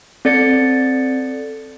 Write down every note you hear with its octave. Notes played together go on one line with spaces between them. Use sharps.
C4 A4 D5 A6 C#7